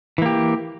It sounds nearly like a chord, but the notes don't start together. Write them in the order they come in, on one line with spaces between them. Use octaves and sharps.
E3 A#3 G4